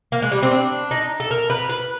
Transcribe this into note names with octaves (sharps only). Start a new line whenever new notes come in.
A#3
G#3
G3
C4
D4
D#4
A4
A#4
B4
B4